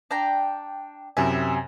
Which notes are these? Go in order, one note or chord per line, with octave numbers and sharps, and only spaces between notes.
D4 G5 A#5
F#2 C3 E4 E5 G#5